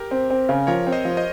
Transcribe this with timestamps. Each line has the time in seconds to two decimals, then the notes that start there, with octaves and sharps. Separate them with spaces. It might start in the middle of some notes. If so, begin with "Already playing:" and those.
Already playing: G4 A#4
0.11 C4
0.30 C4
0.49 C#3
0.67 F3 A#4 C#5
0.87 C4
0.92 C5 D#5
1.05 F3
1.17 C5 D#5